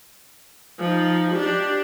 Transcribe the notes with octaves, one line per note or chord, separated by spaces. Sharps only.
F3 D#4
D4 G4